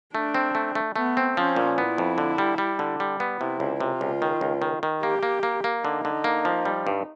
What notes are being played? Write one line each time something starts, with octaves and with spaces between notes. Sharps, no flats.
A3 D4
C4
A3
A3
A3 B3
C4
F3 C#4
A#2
B3 E4
F2
D3
G3
G3
D3
G3
B3
C3 E4
C#2
C3 F4
C#2
D#3
C#2
D#3
D#3
A#3 G4
A#3
A#3
A#3
D3 D#4
D3
A#3
F3
G3
G2